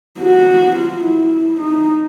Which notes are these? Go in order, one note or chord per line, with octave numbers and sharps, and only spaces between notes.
F#4
F4
E4
D#4